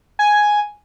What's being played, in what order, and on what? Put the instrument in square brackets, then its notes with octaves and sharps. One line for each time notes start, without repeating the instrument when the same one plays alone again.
[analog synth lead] G#5